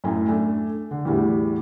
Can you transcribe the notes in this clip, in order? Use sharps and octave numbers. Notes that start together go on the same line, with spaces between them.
F#2 A2 A3 G#5
A3 D4 G#5
D3
E2 A2 G3